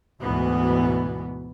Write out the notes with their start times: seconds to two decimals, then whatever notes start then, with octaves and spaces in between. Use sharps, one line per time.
0.22 D2 G#2 B2 E3 B3